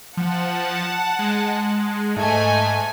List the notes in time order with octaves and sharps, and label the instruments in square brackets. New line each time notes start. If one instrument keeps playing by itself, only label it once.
[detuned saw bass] F3 [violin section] F#5 A5
[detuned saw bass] G#3
[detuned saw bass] G#2 [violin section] A3 D#5 G#5